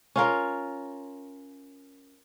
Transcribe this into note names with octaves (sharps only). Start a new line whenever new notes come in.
C#4 F4 A#4